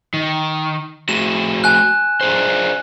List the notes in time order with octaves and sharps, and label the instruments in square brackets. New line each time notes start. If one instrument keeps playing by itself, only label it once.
[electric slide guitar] D#3
[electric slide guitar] A3 F#4 G#4 [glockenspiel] E7
[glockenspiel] G#5 F#6
[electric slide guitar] D4 G#4 C5